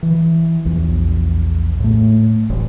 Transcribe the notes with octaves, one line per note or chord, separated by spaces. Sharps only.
E3
A#1 E2
A2 A3
D#1 A1